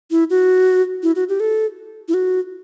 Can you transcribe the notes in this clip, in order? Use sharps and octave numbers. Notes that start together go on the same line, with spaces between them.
E4
F#4
E4
F#4
G4
A4
E4
F#4